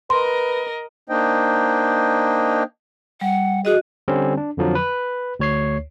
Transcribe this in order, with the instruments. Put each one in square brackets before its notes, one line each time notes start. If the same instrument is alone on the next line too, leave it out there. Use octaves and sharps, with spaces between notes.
[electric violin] A#4 D#5 [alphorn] B4 [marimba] C6
[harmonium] A#3 D4 D#4 C5 D#5 G5
[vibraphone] G3 [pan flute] F#5
[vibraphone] F#4 D#5 [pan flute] G#4
[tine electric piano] D3 G3 C4 C#4
D4
F2 D3 F3 F#3
B4
D2 C#5 C7